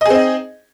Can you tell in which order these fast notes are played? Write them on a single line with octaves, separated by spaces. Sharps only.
D#5 G#4 C4 D#4